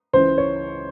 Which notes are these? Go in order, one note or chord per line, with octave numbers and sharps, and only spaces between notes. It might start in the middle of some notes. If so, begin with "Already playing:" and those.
C#2 C#3 E3 C5
C#5